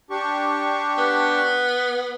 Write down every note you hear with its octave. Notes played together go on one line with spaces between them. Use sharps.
D4 G4 C#6
B3